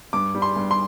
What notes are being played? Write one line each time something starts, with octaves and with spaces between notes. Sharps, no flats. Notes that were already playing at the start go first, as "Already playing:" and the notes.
G2 D6
G3
C6
G2
C6